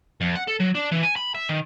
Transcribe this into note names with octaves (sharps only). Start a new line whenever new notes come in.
F2
F#5
A4
F#3
D4
E3
G#5
B5
E5
D#3